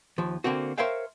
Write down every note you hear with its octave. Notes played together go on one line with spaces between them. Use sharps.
D#2 F3
D3 A#3 C4 F#4
A#4 C5 C#5 E5 F5 G5